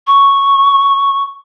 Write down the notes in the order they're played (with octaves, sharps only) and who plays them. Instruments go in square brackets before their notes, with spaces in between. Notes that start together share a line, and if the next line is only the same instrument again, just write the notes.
[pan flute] C#6